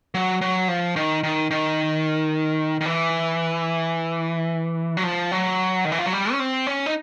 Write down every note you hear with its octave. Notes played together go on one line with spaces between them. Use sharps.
F#3
F#3
F3
D#3
D#3
D#3
D#3
E3
F#3
F3
F#3
D#3
E3
F3
F#3
G3
C#4
C4
C#4
D#4